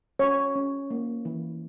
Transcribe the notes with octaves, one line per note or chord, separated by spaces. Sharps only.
C#4 C#5
C#4
A#3
E3